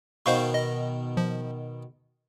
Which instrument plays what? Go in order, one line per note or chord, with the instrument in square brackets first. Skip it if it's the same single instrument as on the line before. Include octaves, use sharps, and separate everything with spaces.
[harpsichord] B2 D#3 [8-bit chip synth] C5 F5 C#6
[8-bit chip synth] D#5
F3